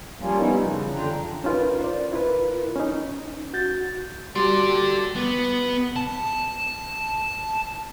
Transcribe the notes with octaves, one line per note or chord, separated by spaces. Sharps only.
F3 G3 A#3 C#4 F4
G3 B3 C#4 D#4 E4
C#3 E3 F3
F2 D3 D4 F4 G5 A#5
C#4 D#4 F4 A#4 B4
C5 D5
E4 F4 A#4 B4
C#4 D#4
F#4 G6 A6
G3 A#3 F#4 G4 A4 D5 C6
B3
A5